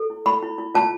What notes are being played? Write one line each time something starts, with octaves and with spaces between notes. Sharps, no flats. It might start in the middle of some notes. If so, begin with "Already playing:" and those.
Already playing: A4
E4
E4 B5
E4
E4
F4 A5